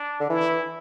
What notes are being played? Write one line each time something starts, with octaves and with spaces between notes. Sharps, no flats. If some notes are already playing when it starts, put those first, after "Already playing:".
Already playing: D4
D3
E3 E4